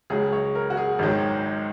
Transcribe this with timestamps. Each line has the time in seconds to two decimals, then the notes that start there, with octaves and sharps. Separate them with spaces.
0.10 C#2 C#3 F#3 G#4
0.33 C#5
0.55 A#4
0.70 F#4
0.77 G#4
0.99 G#1 G#2 D#3 F#3